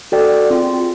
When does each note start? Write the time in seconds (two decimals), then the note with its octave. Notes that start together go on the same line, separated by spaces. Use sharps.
0.12 F#4 A4 D5 G5
0.50 C4 F4 G#4